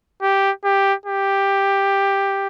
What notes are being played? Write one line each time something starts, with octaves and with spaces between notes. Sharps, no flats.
G4
G4
G4